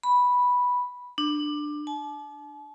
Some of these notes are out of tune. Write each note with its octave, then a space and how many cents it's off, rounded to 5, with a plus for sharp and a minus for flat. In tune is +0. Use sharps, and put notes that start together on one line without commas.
B5 -5
D4 +15
A5 -40